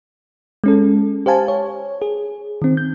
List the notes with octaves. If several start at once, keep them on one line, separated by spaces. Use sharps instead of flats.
G#3 C#4 A4
G4 C5 F5 G#5 A5
C#5
G#4
D#3 C4
G6